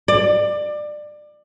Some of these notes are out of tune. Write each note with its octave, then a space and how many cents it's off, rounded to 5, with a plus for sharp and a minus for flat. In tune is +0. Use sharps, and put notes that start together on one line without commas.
D5 +25